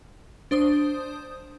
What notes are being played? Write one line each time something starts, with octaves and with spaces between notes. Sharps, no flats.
D4 C5 D#6